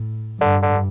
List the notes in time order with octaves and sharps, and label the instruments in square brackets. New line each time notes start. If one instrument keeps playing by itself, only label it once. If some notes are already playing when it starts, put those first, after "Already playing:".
Already playing: [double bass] A2
[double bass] G2 [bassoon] D3
[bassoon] D3